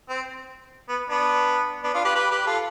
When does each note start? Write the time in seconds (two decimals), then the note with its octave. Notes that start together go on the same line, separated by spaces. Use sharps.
0.09 C4
0.89 B3
1.10 B3 D4
1.84 B3 D4
1.94 D4 F4
2.04 G4 B4
2.15 G4 B4
2.31 G4 B4
2.47 F4 A4